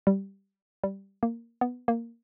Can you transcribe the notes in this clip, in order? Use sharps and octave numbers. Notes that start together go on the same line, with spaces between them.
G3
G3
A#3
B3
A#3